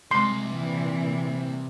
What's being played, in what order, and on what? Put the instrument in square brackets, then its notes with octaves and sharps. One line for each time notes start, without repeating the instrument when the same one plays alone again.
[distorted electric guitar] C3 D5 [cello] G#3 [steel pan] C6
[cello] A#2 E3